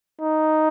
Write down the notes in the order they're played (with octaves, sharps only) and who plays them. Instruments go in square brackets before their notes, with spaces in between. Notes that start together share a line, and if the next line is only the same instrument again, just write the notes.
[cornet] D#4